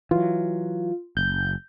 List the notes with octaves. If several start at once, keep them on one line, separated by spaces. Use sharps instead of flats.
E3 F#3 F4
F#1 G6